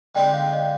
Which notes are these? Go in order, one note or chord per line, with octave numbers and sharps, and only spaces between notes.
D3 G#3 C4 D#4 G4 G5
F5
D#5